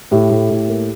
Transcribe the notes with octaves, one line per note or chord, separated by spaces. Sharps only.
A2 G4
A2
A2
A#3